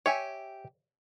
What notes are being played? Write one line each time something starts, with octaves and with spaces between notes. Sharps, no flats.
G4 C#5 E5 G#5